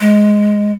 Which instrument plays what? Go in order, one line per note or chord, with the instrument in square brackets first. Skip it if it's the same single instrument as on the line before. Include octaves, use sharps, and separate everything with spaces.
[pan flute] G#3